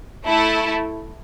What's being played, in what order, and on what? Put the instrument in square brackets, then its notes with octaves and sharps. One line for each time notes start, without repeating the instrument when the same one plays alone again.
[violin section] A3 E4 A4